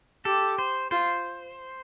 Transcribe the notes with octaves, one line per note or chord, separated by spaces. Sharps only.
G4 A4
C5
F4 C5